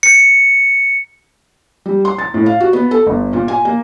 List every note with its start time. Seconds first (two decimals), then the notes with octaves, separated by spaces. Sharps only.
0.03 C#7
1.86 G3
2.05 C6
2.18 A6
2.34 A2
2.46 F5
2.60 F#4
2.73 B3
2.91 A4
3.07 G1
3.33 A#2
3.48 G#5
3.65 A#3